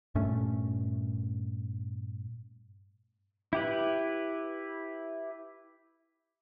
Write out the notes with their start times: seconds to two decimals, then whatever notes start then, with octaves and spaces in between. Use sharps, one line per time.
0.15 G2 A#2 A3 C#4
3.53 E4 G4 B4